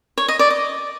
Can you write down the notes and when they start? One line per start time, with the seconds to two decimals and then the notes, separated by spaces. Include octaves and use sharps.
0.18 C#5
0.28 D#5
0.39 D5
0.50 D#5